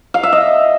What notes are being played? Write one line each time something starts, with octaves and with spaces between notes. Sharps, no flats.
F5
E5
D#5